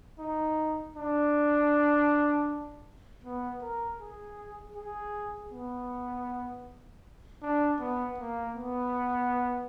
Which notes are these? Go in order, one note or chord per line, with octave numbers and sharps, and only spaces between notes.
D#4
D4
B3
A#4
G#4
G#4
B3
D4
B3
A#3
B3